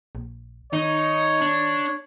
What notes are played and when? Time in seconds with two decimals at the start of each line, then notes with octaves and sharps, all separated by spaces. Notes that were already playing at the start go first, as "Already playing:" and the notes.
0.15 A#1
0.73 D#3 D#4 C#5
1.42 D4